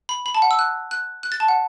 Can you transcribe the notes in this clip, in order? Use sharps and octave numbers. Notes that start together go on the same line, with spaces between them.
B5
B5
A5
F#5
E6
F#6
F#6
F#6
A6
A5
F#5